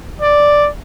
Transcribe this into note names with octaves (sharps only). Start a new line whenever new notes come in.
D5